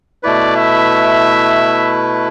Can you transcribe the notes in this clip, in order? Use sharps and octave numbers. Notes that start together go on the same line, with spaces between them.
B2 A3 E4 B4 D5
E5